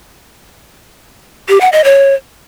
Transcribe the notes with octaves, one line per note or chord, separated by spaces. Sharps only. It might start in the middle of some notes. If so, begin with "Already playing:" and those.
G4
F#5
D#5
C#5